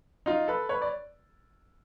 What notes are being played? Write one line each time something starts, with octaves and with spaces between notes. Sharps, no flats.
D#4 F4
A4 B4
B4 C#5
D5